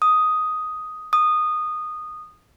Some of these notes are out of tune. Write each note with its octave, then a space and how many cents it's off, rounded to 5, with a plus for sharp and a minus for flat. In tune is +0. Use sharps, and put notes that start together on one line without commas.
D#6 +5
D#6 -15